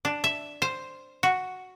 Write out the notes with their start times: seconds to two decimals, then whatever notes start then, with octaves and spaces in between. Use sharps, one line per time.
0.05 D4
0.24 E5
0.62 C5
1.23 F#4